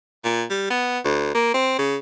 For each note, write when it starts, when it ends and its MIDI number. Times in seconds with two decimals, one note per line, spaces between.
0.24 0.44 46
0.50 0.70 55
0.70 0.99 59
1.05 1.31 38
1.34 1.54 58
1.54 1.75 60
1.79 1.97 49